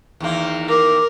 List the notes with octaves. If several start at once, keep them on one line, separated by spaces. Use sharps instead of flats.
E2 D#3 A#3
A#4 D6